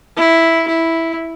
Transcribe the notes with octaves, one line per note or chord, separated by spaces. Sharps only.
E4
E4